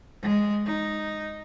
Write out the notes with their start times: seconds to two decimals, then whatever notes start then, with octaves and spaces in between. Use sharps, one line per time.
0.22 G#3
0.66 D#4